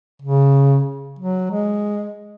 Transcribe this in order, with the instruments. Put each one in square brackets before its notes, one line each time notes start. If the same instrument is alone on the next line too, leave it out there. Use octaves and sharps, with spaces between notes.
[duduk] C#3
F#3
G#3